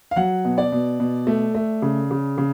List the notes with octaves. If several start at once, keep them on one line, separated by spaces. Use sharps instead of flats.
F5
F#3 F#5
B2
D5
B2
B2
A3
A3
C#3
C#3
C#3